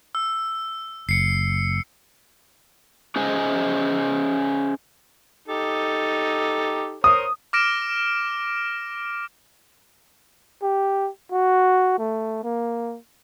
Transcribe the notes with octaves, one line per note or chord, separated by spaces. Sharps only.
E6
F#1 C7 C#7
C#4 G#4 C5 D#5 G#5
D#4 G4 A4
A#4 C5 C#5 D#6
D6 F6 A#6 D7 E7
G4
F#4
A3
A#3